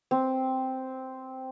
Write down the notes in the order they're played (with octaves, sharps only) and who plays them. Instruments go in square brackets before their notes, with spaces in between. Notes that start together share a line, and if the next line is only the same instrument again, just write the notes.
[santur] C4